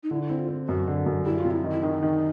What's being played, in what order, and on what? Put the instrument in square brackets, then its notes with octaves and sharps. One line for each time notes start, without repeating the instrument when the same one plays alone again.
[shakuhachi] D#4
[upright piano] D3 [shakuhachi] E4
[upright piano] C4 [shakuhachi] E4
[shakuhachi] F4
[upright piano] C4
[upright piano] F#2 [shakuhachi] F#4
[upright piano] D3
F#2
[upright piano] G3 [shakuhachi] E4
[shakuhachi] F4
[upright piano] C3
[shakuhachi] E4
[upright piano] D#3
[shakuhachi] E4
[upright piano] D#3 [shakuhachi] D#4
[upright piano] D#3